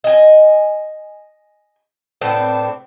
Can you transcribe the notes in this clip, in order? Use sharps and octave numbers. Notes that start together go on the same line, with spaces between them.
D#5 G#5
A2 B3 C4 D4